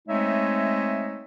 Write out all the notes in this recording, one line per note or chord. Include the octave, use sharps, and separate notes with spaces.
G#3 A3 C4 D#4 C#5 E5